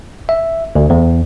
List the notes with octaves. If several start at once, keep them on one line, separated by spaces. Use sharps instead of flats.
E5
D2
E2